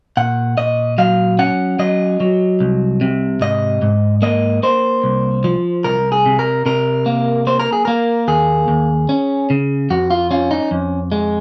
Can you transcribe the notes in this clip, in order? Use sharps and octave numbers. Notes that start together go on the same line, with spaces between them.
A#2 F#5
A#2 D#5
F#3 F5
C#4 F#5
F#3 D#5
F#3
C2
C3
G#2 D#5
G#2
A#3 D#5
A#3 C5
C2
F3
C2 A#4
G#4
C3
A#4
C3 A#4
A#3
A#3 C5
A#4
G#4
A#3 A#4
D#2 G#4
D#2
C#4
C#3
F2 F#4
F4
C#4 F4
D#4
F2
G#3